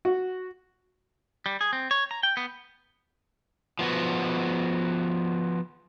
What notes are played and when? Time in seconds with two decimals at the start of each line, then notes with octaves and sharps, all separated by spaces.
0.05 F#4
1.46 G3
1.61 G#4
1.73 C4
1.91 C#5
2.11 A#5
2.23 G5
2.37 B3
3.79 F3 B3 F#4